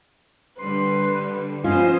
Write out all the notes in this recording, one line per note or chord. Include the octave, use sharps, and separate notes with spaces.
D3 G3 B4 C6
F3 B3 C#4 F4 C5 D#5